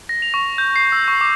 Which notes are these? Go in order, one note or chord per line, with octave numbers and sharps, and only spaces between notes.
A#6
F7
C#6
G6
C7
E6
C#6
D6